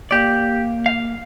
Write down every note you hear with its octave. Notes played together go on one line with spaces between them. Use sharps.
A#3 G4 D5
F5